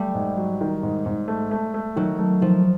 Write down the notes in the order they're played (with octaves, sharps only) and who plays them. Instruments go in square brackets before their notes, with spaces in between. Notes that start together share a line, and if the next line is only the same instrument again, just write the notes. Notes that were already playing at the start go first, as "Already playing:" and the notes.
Already playing: [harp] G3 [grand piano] A3
[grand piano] G#2
F#3
D#3
G#2
G#2
A3
A3
A3
[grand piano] D#3 [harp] F#3
[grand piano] A3
[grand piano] D#3 [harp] F3